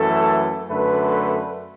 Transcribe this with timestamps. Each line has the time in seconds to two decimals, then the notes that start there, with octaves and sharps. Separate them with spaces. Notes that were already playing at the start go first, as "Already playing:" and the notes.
Already playing: F#2 E3 A3 A4
0.69 F#2 D3 A3 B4